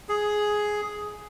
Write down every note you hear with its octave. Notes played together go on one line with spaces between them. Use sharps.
G#4